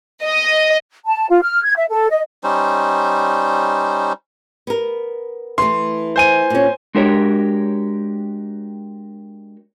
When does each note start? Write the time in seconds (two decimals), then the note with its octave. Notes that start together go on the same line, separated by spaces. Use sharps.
0.23 D#5
1.06 A5
1.29 F4
1.42 F6
1.64 G#6
1.76 E5
1.90 A4
2.10 D#5
2.44 G3 C#4 D#4 C5
4.67 B3 A#4
5.58 E3 A3 C6
6.16 C5 G#5 D#7
6.50 A#2 C#4
6.95 G#3 D4 F#4 G4 A#4 C#5